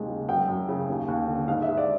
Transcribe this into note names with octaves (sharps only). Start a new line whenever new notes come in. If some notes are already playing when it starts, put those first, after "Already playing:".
Already playing: D#2 C3 G#3
C#3
F#2 G5
F#2
C#3
D#2
D#2
D3
G#2 F5
E5
G#2
D5